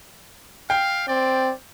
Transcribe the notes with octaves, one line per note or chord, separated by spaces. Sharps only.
F5 G5
C4 D5